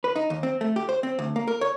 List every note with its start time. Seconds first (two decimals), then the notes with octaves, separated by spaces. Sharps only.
0.04 B4
0.16 D#4
0.30 D#2
0.43 C4
0.61 A3
0.76 G4
0.89 C5
1.03 C4
1.19 D2
1.36 A#3
1.47 A#4
1.61 C#5